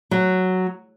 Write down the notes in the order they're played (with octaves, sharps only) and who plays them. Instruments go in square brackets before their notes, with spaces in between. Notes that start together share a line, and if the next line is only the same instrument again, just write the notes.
[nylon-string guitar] F#3